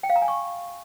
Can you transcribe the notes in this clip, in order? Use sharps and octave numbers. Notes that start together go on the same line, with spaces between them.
G5
F5
A#5
G#5
C#6